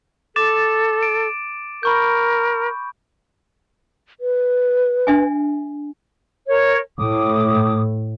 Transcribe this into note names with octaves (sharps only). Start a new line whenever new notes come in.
A4 D6 A6 E7
D7
A#4 B5 C#6 G6
B4
D4 E5 G#5
A#4 C#5
A2 D6 D#6